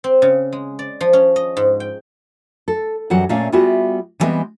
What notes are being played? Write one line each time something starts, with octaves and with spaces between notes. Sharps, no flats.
C4
C#3
G#3
D5
F3
C#4
D#5
G#2
G5
A4
F#2 E3 F#3 G3 F#5
A#2 A3 C#4 D5 F5
G3 B3 F4 F#4 G#4 E5
D3 E3 G3 G#3 B3 C4